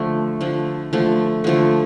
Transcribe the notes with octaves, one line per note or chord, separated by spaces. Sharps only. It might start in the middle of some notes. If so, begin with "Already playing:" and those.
Already playing: D3 F3 A3
D3 F3 A3
D3 F3 A3
D3 F3 A3